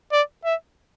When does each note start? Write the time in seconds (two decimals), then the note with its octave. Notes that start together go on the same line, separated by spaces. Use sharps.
0.12 D5
0.44 E5